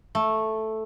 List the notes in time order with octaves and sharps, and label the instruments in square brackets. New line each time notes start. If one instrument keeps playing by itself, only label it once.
[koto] A3